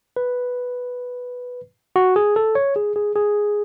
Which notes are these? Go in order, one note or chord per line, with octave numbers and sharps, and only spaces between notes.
B4
F#4
G#4
A4
C#5
G#4
G#4
G#4